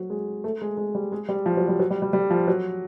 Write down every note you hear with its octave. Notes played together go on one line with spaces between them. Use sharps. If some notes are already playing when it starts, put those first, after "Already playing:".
Already playing: F#3
G#3
A3
G#3
G#3
G3
G#3
G3
F3
F#3
G3
F#3
G3
G3
G3
F3
F#3